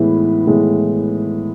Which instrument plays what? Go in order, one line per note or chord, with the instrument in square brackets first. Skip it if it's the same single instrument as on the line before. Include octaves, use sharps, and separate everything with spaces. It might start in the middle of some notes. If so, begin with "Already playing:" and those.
Already playing: [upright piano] A2 E3 G#3 B3 E4 B4
A2 E3 G#3 B3 E4